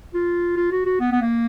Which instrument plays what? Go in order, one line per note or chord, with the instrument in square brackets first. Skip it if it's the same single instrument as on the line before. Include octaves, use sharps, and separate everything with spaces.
[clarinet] F4
F4
F#4
F#4
B3
B3
A#3